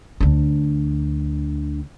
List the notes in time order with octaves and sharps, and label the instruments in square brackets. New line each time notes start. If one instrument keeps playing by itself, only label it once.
[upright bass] D2 D4